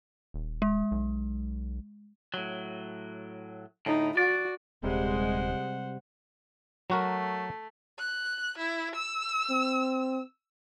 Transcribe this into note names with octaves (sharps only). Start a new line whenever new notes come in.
D#1
G#3
B1
A2 F#3
D2 A2 D#4
F#4 D5
D#1 C3 G3 G#3 C5 F#5
F#3 A3 F#4 A#4
F#6
E4
E6
C4